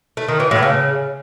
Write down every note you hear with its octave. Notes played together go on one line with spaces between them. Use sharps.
A3
D#3
E3
A2
C#3